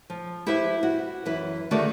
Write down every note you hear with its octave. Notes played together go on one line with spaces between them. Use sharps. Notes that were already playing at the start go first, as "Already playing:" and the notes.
F3
E4 G4 B4 C5 E5
F#4
F#2 E3 B4
D3 D#3 A3 F#4 G#4 D5